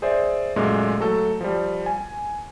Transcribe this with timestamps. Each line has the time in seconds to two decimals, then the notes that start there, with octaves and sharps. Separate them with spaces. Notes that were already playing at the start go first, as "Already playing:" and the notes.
0.02 G#4 C5 D5 E5
0.56 F#2 A#2 G#3 A3
1.00 F#3 A3 F#4 A4
1.41 F3 G3
1.86 G#5